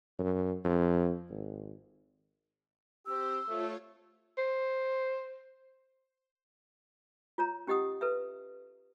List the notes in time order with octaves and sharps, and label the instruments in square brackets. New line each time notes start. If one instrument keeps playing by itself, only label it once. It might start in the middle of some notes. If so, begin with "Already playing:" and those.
[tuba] F#2
F2
G#1
[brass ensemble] C4 G4 [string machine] C5 [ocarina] E6
[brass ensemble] A3 [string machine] F4 C#5
[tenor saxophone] C5
[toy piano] F4 C#5 A#5
C#4 G4 D#5 F#5 D#6
A4 B4 E5